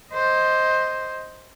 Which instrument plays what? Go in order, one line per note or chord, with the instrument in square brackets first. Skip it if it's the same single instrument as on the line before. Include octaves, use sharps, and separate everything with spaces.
[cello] C5 D#5